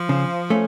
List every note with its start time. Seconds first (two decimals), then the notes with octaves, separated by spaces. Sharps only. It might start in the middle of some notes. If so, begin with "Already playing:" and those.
Already playing: F3
0.09 C#3
0.50 A3 C#4